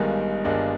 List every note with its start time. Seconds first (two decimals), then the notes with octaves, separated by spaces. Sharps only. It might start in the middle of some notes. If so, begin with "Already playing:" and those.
Already playing: G1 G2 D#3 G#3 D#4
0.44 G1 G2 D#3 G#3 D4